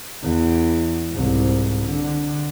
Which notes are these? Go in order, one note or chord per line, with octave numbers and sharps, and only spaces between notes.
E2
C2 G#2
D3